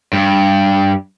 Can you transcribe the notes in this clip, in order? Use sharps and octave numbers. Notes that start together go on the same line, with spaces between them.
G2